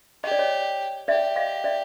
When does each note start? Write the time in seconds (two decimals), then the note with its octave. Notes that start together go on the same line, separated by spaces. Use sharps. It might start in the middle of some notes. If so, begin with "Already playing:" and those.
0.24 G4 D#5
0.32 D5
0.39 C#5 D#5
1.08 G4 D5 E5
1.36 D#5 F5
1.64 D5 E5